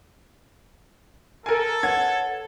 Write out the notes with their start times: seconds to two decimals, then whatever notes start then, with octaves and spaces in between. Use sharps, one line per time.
1.46 A4 A#4 G#5
1.83 B4 C#5 F#5 G#6